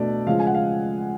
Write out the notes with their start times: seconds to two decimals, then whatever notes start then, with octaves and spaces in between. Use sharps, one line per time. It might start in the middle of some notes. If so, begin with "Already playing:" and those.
Already playing: B2 A3 D4 D5
0.27 C#3 F3 G#3 F5
0.40 G#5
0.47 F#5
0.55 F5